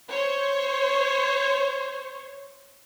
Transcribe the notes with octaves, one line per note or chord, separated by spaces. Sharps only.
C5 C#5